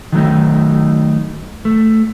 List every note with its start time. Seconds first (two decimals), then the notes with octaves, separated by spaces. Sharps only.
0.12 D#3 F#3 A3 D#4
1.65 A3